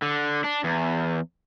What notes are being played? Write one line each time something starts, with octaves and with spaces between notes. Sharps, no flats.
D3
D4
E2